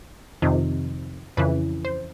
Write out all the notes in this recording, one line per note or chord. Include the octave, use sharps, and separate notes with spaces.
F2 C3 D#3
F2 C#3 E3 B4
C5